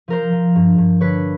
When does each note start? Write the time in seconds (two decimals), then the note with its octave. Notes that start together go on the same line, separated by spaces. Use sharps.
0.08 F3 A#4 C5
0.32 F3
0.56 G2
0.78 G2
1.01 D3 B4 C#5